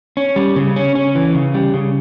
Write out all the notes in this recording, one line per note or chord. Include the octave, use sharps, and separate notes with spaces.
C#4
G3
C#3
C#4
C#4
E3
C#3
G3
C#3